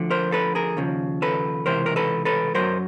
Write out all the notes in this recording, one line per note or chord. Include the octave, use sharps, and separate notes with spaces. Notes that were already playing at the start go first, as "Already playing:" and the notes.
Already playing: D2 D3 F3
A#4 C5
A4 B4
G#4 A#4
D#2 C#3 F3
A4 B4
C#2 C3 E3 A#4 C5
A#4
A4 B4
A4 B4
F#2 C#3 F#3 A#4 C5